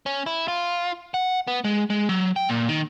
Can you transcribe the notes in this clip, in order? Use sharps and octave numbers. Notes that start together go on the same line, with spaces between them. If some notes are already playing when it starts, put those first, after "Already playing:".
C#4
E4
F4
F#5
B3
G#3
G#3
F#3
G5
A#2
D#3